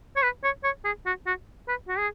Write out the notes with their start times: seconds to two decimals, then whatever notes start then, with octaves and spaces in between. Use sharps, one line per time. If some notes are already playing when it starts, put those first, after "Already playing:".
0.16 C#5
0.22 B4
0.44 C#5
0.64 C#5
0.85 G#4
1.06 F#4
1.26 F#4
1.68 B4
1.88 F#4
1.98 G#4